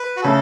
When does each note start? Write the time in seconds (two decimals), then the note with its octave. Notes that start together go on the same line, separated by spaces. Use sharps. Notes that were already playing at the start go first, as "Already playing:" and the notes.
Already playing: B4
0.17 F#4
0.22 C#3 A3 A4